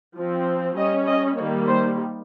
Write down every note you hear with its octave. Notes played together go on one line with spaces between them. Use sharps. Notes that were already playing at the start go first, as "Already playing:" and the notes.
F3 C4
G3 C#4 D#5
D#5
D#3 G3 A#3 C#5
C5